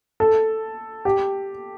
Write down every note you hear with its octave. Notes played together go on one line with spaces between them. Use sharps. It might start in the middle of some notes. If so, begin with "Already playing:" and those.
A4
G4